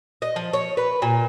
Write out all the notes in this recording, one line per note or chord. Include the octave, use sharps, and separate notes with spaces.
D#5
F3
C#5
B4
A#2